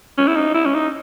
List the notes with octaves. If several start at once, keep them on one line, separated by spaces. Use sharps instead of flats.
C#4
E4
D#4
E4
C#4
D#4